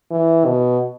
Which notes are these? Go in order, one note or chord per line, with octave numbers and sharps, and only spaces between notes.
E3
B2